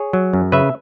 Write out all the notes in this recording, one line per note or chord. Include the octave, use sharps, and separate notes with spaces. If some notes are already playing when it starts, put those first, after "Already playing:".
Already playing: G#4 C#5
F#3
F#2
C#3 B4 E5